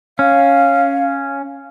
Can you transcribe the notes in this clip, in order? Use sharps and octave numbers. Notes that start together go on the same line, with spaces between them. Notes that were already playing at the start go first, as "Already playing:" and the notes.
C#4 F5